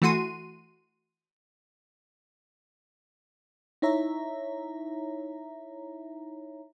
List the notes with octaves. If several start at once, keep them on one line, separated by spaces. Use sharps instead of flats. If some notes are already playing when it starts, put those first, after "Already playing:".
E3 A3 F#4 C6 D#7
D#4 E4 C#5 E5 A#5